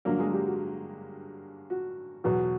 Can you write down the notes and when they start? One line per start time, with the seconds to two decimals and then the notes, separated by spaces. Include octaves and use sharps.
0.05 G2 D3 F#3 A#3 A#4
0.19 G#3 G#4
0.33 G3 G4
0.47 F#4
1.70 F#4
2.24 E2 B2 F#3 F#4